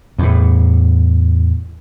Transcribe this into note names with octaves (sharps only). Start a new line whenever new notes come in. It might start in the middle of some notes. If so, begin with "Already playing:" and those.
E2 A2